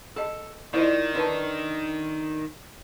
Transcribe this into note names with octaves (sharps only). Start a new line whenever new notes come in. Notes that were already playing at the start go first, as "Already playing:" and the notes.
G#4 A4 D#5
D#3 E4 F4 C5 D5 D#5
D3 D#4 B4 C#5 A5